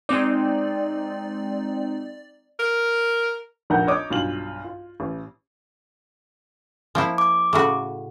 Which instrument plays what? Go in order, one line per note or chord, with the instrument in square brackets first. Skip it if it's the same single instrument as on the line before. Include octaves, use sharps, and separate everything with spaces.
[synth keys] G#3 C4 D#4 [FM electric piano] D5
[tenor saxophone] A#4
[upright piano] F1 A#1 A#4 F#5 A#5 G6
C#5 D#5 D6 D#6
B1 G2 F4 F#7
F4
A1
[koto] F3 A#3 E4
[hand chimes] D6
[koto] A2 C#3 F#4